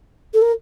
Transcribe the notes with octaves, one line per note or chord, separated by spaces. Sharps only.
A4
A#4